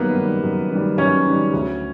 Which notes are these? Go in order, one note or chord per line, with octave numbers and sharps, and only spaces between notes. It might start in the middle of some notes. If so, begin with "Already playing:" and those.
Already playing: F#2 D#3 G3 A#3 B3 B4
D#3 G3
F#2
D#3 G3
F#2 C#4 C#5
D#3 G3
D2